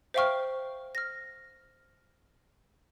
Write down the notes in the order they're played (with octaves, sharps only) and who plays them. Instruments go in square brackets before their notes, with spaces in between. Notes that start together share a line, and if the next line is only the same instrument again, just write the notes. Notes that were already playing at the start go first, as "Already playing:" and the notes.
[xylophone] C5 E5 F5 G5 C#6 F6
F6 A#6